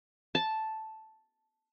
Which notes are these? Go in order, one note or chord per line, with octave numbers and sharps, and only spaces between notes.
A5